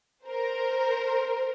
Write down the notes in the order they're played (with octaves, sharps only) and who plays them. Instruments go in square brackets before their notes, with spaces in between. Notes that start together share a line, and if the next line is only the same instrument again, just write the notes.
[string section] A#4 C5